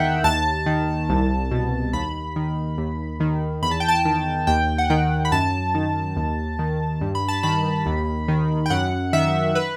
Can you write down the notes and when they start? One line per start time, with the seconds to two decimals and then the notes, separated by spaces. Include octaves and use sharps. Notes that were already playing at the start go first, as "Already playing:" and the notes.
Already playing: E2 D#3 E5 F#5 G5
0.24 D#2 A5
0.66 D#3
1.09 C2
1.51 B2
1.93 D#2 B5
2.36 D#3
2.78 D#2
3.20 D#3
3.63 E2 B5
3.71 A5
3.80 G5
3.88 A5
4.05 D#3
4.47 D#2 G5
4.78 F#5
4.90 D#3 G5
5.25 B5
5.32 F#2 A5
5.75 D#3
6.16 D#2
6.59 D#3
7.01 G2
7.15 B5
7.28 A5
7.43 D#3 B5
7.86 D#2
8.28 D#3
8.66 G5
8.70 F#2 F#5
9.13 D#3 E5
9.55 B4